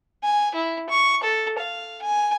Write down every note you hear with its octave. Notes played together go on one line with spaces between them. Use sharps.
G#5
E4
C#6
A4
F5
G#5